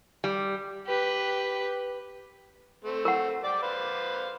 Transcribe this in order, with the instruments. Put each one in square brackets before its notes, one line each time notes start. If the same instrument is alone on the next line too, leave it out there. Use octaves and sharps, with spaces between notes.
[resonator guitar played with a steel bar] G3
[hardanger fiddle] G4 B4
[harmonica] A3 C4
[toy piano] A#4 F#5
[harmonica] G4 D5 D6
B4 C5 F5